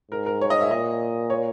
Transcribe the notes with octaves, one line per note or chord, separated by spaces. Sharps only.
G#2 A#4
A#4
C#5
D#5
E5
A#2 D#5
C#5